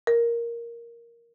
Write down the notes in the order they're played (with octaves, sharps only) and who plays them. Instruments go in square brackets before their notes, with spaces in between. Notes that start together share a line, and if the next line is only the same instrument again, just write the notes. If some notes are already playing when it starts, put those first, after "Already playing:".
[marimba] A#4